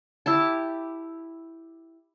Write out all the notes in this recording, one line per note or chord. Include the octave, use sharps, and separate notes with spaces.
E4 G4 A5